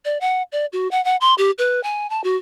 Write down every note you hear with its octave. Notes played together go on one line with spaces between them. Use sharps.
D5
F#5
D5
F#4
F#5
F#5
C6
G4
B4
G#5
A5
F#4